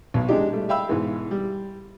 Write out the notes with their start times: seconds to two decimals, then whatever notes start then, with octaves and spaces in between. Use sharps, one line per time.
0.14 B1 B2
0.28 G#3 D4 D#4 G4
0.52 G3 A3
0.69 E5 F5 G5 B5 E6
0.88 G#2 B2 E3 G#3
1.31 G3